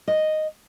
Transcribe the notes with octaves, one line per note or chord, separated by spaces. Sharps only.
D#5